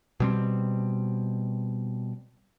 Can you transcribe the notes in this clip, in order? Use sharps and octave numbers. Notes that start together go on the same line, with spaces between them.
B2 G3 C4